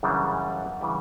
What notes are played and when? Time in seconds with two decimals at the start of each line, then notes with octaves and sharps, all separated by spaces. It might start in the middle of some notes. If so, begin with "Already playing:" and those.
0.03 F#2 C#3 E3 G3 D4
0.80 C#3 E3 G3 D4